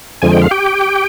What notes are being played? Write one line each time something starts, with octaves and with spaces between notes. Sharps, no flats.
F2 D3 F3 G#3 G#5
G5
F5
G4 G5